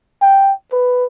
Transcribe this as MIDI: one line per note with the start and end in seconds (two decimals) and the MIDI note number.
0.21 0.53 79
0.72 1.05 71